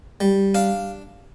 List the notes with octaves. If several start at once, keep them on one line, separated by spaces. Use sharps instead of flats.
G3
D4 F5